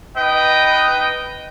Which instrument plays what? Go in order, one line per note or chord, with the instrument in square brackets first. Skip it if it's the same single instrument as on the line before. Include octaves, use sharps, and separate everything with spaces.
[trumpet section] D#4 B4 D#5 G5